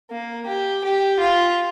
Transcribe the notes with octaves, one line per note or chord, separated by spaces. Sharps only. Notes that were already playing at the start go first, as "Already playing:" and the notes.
A#3
G4
G4
F4